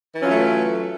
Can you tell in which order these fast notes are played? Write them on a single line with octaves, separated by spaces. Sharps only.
E3 C#4 F#3 F4 A3